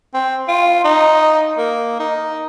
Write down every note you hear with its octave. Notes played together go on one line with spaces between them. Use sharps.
C4
F4
D#4
A#3
D#4